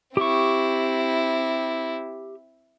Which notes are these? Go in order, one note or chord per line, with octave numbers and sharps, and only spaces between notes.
C4 E4 G4 C#6